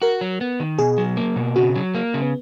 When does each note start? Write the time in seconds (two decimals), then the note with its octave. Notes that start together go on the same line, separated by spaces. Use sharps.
0.02 F#4 A#4
0.21 F#3
0.41 B3
0.60 D#3
0.79 B2 G#4
0.98 F#3
1.17 A#3
1.36 B2
1.56 C#3 F#4
1.76 F#3
1.95 A#3
2.14 C#3
2.22 B3